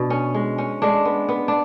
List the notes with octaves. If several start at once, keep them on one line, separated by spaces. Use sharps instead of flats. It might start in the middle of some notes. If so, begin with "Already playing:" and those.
Already playing: B2 D4
C#4
G#3
C#4
G#3 D4
B3
B3
D4